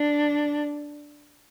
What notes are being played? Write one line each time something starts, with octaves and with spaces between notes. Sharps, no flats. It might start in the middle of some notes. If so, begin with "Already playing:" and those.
Already playing: D4